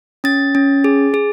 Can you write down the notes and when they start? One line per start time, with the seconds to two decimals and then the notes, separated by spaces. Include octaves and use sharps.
0.24 C#4 A6
0.55 C#4
0.84 G#4
1.14 G#4